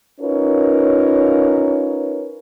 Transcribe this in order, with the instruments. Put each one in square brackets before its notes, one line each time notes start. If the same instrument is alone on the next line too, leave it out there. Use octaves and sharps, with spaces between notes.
[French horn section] C#4 D#4 F4 A#4 B4 C#5